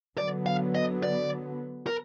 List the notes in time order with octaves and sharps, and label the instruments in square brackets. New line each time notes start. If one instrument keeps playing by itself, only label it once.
[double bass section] D3 F#3 B3 [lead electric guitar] D5
[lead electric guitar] F5
D#5
D5
A#4